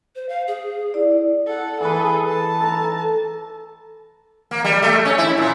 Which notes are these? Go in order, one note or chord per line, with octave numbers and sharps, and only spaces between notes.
C5
F5
G#4
E4 D5
A4 F#5
E3 G#4 A4 B4
A5
A4 A#5
A#3
G3
A3
C#4
E4
A#2